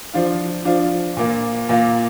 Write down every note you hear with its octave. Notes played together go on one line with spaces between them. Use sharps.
F3 D4 F4
F3 D4 F4
A#2 A#3 F4
A#2 A#3 F4